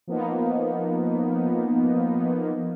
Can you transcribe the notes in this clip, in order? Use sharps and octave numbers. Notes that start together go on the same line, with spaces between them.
F3 A#3 B3 D#4